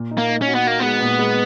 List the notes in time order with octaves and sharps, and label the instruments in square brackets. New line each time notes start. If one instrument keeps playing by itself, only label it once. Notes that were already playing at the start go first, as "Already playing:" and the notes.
Already playing: [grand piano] A#2
D#4
[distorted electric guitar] A#3
[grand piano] D#4
[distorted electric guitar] C#4
[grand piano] F#4
[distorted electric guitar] B3
[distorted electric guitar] A#3 [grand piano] F#4
[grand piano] G#3 [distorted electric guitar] B3
[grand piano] A#2
G#3